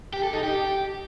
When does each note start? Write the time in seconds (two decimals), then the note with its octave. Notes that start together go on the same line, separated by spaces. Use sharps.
0.13 G4
0.23 A4
0.33 D#4
0.43 G4